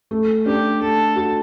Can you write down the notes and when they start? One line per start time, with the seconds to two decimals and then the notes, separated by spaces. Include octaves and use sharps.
0.11 A3
0.46 D4 G4
0.81 A3 A4
1.16 F#4